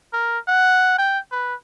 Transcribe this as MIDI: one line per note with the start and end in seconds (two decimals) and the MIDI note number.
0.13 0.39 70
0.47 0.95 78
0.98 1.19 79
1.32 1.55 71